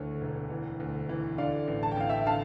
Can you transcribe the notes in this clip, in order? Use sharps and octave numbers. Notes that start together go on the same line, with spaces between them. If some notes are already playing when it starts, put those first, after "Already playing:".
Already playing: D2 D3 E3 C#5
E1
E3
D2
E3
D3 D5 F5
A1
A5
G5
A1 F5
E5 G5
D3 F5 A5